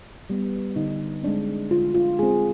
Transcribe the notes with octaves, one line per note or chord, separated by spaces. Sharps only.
G3 B3
D3 D#4
G#3 C4 D4
D3 F4
F4
G#3 C4 G#4